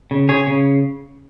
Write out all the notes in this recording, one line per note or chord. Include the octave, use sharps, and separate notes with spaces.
C#3
C#3 G#4 C#5
C#3